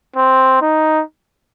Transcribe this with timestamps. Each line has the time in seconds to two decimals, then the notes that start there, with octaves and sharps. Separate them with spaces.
0.16 C4
0.61 D#4